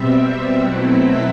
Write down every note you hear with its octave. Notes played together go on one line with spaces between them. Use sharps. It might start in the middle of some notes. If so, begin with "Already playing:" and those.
Already playing: B2 G3 C4 E5
B2 F#3 A3 C4 E4 F#5
E5